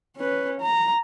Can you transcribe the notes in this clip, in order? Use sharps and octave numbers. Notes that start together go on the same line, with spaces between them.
C#4 B4
A#5